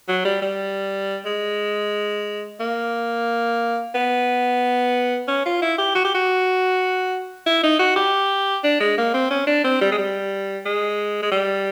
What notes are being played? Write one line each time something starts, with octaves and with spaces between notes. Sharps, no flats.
F#3
G3
G3
G#3
A#3
B3
C#4
F4
E4
G4
F#4
G4
F#4
E4
D#4
F#4
G4
D4
G#3
A#3
C4
C#4
D4
C4
G3
G#3
G3
G#3
G#3
G3